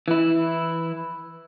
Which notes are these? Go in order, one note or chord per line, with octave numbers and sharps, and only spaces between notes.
E3 E4